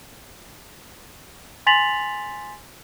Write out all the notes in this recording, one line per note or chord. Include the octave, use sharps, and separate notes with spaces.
G#5 C6 A6 B6 F7 F#7